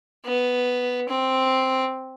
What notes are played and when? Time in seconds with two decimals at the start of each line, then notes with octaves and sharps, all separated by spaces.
0.25 B3
1.08 C4